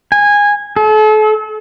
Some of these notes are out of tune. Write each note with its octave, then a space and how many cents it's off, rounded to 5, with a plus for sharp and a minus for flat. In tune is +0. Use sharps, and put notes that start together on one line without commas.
G#5 -15
A4 -40